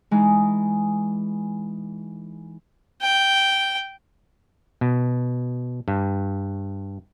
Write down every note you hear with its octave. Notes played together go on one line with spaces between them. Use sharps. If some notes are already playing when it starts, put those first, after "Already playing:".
E3 G#3 D#4
G5
B2
G2